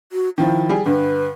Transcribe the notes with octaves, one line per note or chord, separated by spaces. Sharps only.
F#4
D#3 F3 E4
G3 G#4
G2 D3 B4